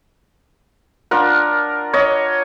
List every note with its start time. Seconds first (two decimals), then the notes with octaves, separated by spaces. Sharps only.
1.11 D4 F4 A#4 F#5
1.93 C#5 D#5